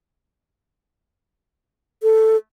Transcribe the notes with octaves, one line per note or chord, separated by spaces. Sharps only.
A4